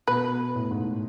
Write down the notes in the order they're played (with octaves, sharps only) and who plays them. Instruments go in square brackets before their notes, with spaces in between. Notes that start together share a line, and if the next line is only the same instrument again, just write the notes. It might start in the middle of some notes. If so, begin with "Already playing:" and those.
[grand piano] B2 [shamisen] B4
[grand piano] A2
G#2